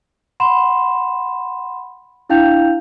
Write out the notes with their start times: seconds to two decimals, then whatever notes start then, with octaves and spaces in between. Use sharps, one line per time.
0.40 F#5 B5 C6 E7
2.29 D4 E4 F5 G5 G6 F7